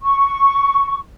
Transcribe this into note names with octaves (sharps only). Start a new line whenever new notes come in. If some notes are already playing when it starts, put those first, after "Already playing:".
C#6